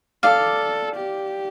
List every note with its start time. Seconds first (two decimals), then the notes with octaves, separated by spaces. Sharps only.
0.23 A4 D5 F5
0.96 G4